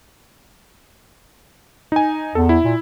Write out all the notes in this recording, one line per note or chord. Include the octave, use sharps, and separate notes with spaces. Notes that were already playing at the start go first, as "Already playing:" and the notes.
D#4 G#5
E2 A4
E4
A#2